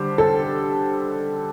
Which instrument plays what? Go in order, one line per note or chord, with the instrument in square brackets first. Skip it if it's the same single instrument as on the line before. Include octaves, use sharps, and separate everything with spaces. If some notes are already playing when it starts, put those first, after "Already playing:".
Already playing: [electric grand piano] D3 G3 D4 G4 C5
[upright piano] A4